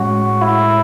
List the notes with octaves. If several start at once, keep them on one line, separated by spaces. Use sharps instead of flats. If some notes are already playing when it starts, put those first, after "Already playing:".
Already playing: A2 G#3 C#4 F#4
E4